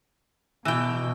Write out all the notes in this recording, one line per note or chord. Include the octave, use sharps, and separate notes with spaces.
B2 E3 G5